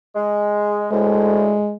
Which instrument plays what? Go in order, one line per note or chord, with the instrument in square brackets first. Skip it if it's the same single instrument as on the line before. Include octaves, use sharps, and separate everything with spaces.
[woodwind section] G#3
[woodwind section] D2 A2 [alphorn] G#3